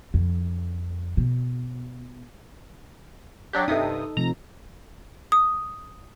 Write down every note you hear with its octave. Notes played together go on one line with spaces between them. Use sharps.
F2
B2
F#3 D4 G4
G2 C3 D#4 A4 D#6
C3 F3 A3 A#5 A#6
D#6